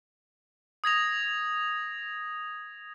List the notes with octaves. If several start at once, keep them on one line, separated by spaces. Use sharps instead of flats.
D#6 G#6 A#6 F7